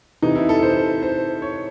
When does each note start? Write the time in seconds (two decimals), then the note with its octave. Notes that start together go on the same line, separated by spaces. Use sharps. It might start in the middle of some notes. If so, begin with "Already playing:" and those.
0.22 C3 E3 D#4
0.35 E4
0.49 A4
0.63 C5
1.02 C5
1.42 C#5